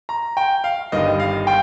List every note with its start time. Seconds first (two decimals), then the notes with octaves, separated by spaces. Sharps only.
0.09 A#5
0.37 G5
0.64 F5
0.92 G1 G2 D#3 D#5
1.20 F5
1.47 G5